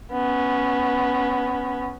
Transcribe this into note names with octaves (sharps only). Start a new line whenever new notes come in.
B3 C#4